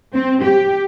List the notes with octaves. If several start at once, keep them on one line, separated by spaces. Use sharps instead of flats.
C4
G4